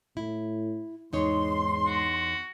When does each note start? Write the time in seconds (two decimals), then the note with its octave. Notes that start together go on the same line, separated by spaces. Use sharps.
0.17 A2 E4
1.13 E2 G#2 D#4 C#5 C6
1.86 F#4